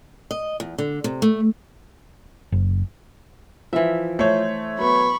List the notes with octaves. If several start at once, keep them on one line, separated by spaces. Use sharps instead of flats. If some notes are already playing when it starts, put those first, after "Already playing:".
D#5
E2
D3
C3
A3
F#1
E3 F3 E5
A3 C5 C#5
F#3 B3 B5 C#6